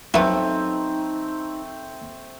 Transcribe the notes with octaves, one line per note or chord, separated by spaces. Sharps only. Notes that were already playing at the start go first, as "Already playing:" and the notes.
F#3 A3 B3 C4 D#4 E4